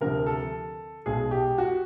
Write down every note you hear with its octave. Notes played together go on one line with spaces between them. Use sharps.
D2 C3 F3 A#4
A4
B1 B2 G#3 G#4
G4
F#4